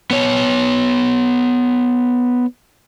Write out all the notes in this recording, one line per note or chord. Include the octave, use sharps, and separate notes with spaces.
B3 C#5